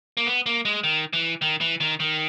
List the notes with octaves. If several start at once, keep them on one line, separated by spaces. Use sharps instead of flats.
A#3
B3
A#3
G#3
D#3
E3
D#3
E3
D#3
D#3